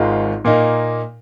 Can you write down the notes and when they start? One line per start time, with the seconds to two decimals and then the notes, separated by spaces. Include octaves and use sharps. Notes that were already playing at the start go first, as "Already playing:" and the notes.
Already playing: G#1 G#2 D#3 G#3 F4
0.45 A#2 A#3 D#4